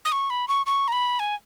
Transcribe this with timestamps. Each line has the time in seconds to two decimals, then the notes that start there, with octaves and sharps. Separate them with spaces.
0.05 D#6
0.12 C#6
0.30 B5
0.48 C#6
0.66 C#6
0.88 A#5
0.92 B5
1.19 G#5